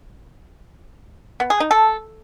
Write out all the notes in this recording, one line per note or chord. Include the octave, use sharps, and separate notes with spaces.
B3
G#4
D#4
A4